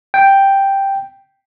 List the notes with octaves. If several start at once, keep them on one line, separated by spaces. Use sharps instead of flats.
G5